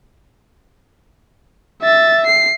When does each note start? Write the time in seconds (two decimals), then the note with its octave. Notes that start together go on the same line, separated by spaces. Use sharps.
1.82 E5 A6
2.27 C7